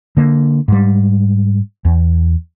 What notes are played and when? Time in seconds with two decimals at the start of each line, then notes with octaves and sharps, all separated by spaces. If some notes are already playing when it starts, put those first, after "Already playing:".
0.17 D3 A#3
0.68 G#2 G3
1.85 E2